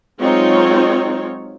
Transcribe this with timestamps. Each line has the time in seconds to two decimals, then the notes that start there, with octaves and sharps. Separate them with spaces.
0.21 F#3 G#3 C4 D#4 F4 C#5